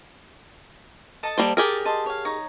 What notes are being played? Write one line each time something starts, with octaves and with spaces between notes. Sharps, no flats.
A4 D#5 A5
G3 A#3 C5
G4 G#4 A#4 D5
D#5 A5 C6
C#5 F5
D#4 C#5 D#6